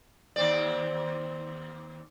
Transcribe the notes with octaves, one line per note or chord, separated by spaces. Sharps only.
D#2 C4 D5